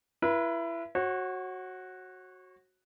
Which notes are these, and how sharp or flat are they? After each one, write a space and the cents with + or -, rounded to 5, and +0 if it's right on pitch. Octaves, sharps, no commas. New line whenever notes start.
E4 +25 B4 -40
F#4 +0 C#5 -40